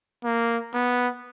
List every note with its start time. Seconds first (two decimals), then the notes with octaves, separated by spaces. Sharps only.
0.24 A#3
0.74 B3